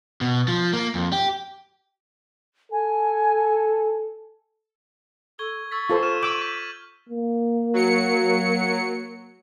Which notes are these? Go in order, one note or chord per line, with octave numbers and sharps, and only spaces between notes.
B2
F3
A#3
F2
G4
A4 G#5
A4 C#6 G#6 G7
C#6 E6 A6 B6
F4 A4 C5
F6 D#7 E7
D6 E6 G6 D#7 F#7
B6
A#3
F#3 C#7